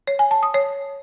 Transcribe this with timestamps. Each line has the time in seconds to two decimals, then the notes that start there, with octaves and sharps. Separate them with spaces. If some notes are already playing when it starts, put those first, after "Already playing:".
0.07 C#5
0.19 G#5
0.31 A5
0.43 D#6
0.54 C#5